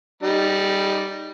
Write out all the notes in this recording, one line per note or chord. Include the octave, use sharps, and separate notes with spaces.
G3 D#4